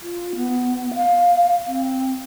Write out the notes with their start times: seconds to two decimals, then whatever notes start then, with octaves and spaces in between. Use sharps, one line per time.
0.02 F4
0.36 B3
0.95 F5
1.67 C4